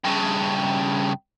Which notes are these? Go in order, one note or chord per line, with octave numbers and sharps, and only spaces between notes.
G2 C#3